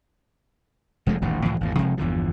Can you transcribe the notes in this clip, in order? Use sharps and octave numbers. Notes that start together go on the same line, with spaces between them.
F1 F3 G#3 A3
D#1 A1 G2 D#3
C#2 A2 E3 F3
G#1 E2 G2
F1 C3 F3 G#3
G1 E2 D3 F3